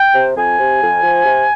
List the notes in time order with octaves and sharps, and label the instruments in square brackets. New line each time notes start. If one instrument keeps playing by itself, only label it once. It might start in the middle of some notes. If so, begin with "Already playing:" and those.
Already playing: [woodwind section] G5
C3
F2 G#5
C3
F2
F3
C3